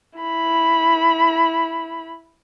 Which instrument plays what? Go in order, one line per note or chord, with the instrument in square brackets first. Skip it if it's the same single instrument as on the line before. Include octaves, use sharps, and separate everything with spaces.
[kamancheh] E4 B5